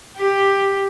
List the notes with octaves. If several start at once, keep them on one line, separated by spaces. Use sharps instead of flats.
G4